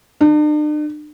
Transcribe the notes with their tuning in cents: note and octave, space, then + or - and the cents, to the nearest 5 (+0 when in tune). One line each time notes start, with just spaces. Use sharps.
D4 +45